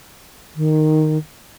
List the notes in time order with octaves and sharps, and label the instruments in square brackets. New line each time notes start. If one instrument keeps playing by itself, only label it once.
[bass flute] D#3